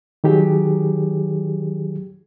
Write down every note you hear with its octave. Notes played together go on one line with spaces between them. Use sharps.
D#3 F#3 G4 G#4